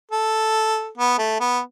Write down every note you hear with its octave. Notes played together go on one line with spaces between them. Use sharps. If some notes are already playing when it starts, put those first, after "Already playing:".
A4
B3
A3
B3